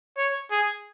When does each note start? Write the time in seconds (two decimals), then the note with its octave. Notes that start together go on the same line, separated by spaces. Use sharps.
0.17 C#5
0.51 G#4